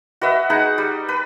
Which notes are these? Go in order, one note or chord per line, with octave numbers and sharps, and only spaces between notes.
F#4 B4 D#5 E5
D#4 G#4 F#5 B5
G3
B4